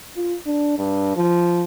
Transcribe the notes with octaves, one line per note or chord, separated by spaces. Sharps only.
F4
D4
G2
F3